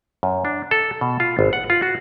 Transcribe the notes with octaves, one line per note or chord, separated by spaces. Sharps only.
F#2
D4
A4
B2
F4
G#1
F#5
F4
F#4